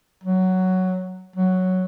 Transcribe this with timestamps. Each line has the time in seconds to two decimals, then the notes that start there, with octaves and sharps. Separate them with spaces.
0.24 F#3
1.36 F#3